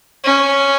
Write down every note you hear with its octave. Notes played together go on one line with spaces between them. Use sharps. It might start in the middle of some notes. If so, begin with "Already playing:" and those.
C#4